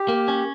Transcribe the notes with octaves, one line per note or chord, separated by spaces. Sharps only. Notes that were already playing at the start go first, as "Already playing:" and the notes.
Already playing: G4
A#3
C#4